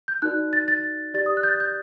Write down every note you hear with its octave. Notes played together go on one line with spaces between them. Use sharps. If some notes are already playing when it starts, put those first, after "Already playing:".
G6
D#4 F#4 A#4 D5 F#6
A6
A6
G4 D5 A6
D#6
F#6
G6
A6
G6